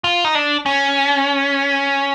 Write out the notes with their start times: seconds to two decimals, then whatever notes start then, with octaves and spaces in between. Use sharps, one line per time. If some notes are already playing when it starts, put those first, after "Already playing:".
0.04 F4
0.24 D#4
0.35 D4
0.66 C#4